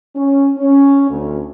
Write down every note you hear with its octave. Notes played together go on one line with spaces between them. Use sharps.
C#4
C#4
D2